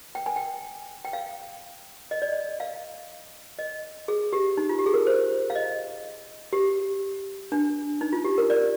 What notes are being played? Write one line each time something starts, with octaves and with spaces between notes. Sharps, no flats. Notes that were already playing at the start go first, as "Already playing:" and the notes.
G5
G#5
G5
G5
F5
D#5
D5
D#5
F5
D#5
G#4
G4
D#4
F4
G4
G#4
A#4
C5
F5
D#5
G4
D4
D#4
F4
G4
A#4
D5